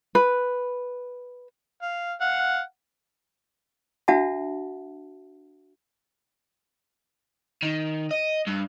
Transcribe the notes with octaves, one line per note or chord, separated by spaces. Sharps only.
B4
F5
F5 F#5
D4 F#4 E5 F#5 A5
D#3
D#5
G2